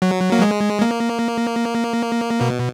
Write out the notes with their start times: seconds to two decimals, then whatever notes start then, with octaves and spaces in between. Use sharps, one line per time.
0.02 F#3
0.32 A#3
0.42 G#3
0.82 A#3
2.41 B2